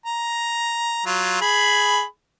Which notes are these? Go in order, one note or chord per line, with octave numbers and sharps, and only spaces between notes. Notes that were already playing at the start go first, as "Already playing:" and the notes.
A#5
F#3 F4
G#4 B5